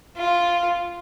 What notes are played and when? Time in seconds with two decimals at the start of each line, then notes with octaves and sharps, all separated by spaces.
0.17 F4